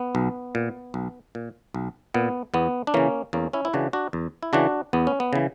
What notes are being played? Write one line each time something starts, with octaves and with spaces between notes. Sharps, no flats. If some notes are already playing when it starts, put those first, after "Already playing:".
Already playing: B3
B1
A#2
B1
A#2
B1
A#2 B3
E2 B3
D4
C#3 E3 A#3 C#4
E2 A#3 C#4
C#4 E4
E4
C#3 E3 D4 F#4
D4 F#4
E2
E4
C#3 E3 D4 F#4
E2 B3
C#4
B3
C#3 E3